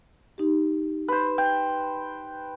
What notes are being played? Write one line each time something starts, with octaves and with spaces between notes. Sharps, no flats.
D#4 G4
B4 C5
G5